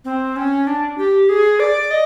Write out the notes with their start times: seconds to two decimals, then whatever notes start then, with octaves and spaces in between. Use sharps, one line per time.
0.05 C4
0.36 C#4
0.67 D4
0.98 G4
1.29 G#4
1.60 D5
1.91 D#5